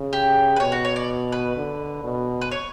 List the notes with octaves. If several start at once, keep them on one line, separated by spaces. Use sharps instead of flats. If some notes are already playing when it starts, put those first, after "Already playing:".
Already playing: C#3
G4
B4
B2 C#5
F#4
C#5
D5
B4
D3
B2
B4
C#5